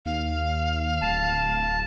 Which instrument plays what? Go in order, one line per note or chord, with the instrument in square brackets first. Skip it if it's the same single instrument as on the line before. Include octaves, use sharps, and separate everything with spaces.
[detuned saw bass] D#2 [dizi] F5
[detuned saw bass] D1 [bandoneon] A5